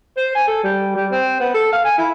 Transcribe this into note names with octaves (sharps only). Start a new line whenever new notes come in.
C5
G#5
A4
G3
G3
C4
B3
A4
F5
G#5
E4